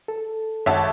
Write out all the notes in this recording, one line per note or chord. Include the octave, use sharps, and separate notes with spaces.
A4
G#1 F#2 C#5 E5 F#5 A5